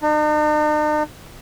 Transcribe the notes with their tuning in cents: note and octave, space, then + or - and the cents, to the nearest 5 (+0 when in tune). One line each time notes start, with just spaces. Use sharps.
D#4 -45